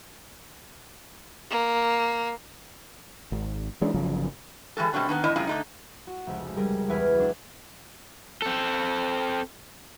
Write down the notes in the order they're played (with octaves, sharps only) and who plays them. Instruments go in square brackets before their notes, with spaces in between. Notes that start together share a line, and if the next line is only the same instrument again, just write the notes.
[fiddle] A#3
[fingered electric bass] G#1
E3 G#3 C#4 D4
G1 C#3 F3 F#3
[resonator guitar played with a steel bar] E3 G3 G#3 A4
B2 G3 A3 C4 D4 F#4
D#3 A#3 B3
E2 A2 E4 D#5
F#2 C3 G#3 E4 F4
D3 A3 D#4
[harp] F#4
F1 C#2
G3 G#4 A#4
E2 E4 B4 G#5 F6
F#3 D4
[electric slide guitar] C4 A4